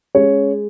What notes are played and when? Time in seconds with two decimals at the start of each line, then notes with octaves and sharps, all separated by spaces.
0.15 G#3 C#4 C#5